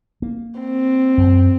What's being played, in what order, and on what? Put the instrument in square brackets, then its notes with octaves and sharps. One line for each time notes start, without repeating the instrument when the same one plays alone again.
[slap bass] A#3
[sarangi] C4
[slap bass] F#2